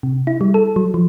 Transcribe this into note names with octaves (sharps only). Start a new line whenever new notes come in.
C3
E4
G3
A4
F#3
F3